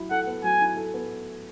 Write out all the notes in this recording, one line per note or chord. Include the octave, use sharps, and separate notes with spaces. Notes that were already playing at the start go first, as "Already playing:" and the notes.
Already playing: F#3 E4
A4 F#5
B3
F#3 G#5
E4
A4
B3